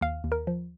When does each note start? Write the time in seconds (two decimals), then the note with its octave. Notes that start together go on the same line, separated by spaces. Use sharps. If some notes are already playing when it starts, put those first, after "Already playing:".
0.01 D#2 F5
0.24 D#2
0.32 A#4
0.47 F3